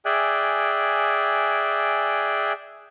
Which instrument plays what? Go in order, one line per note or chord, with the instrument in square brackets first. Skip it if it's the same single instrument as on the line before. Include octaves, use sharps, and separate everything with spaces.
[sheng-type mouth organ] G#4 D5 E5 G5 G#5 F#6